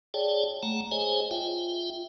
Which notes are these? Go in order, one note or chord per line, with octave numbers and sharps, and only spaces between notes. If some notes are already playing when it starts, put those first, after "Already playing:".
G#4 C#5 D5 G5 A5
A3 F#5 A#5
G#4 C5 C#5 D#5 G#5
F4 E5 G5